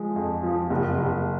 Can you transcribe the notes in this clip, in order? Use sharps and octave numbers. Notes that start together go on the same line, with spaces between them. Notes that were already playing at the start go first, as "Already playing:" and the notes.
Already playing: F3 G#3
F2
F3
F#1
F#1